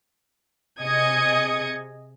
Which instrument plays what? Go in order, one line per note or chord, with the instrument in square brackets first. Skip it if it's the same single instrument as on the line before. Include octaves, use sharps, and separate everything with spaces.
[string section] C3 G#4 D#5 D#6 G#6 C#7